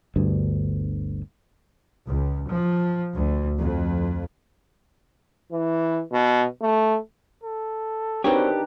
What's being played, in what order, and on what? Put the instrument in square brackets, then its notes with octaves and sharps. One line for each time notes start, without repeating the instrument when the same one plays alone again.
[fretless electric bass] G1 D2 G2
[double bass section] C#2
F3
D2
F2
[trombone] E3
B2
A3
[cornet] A4
[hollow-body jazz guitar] C4 F#4 C#5 [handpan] D4 D#4 B4 [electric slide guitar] G4 [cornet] A#4